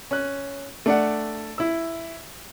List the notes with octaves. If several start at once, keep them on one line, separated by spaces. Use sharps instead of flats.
C#4 F#6
A3 D4 D5 F#5
E4 E6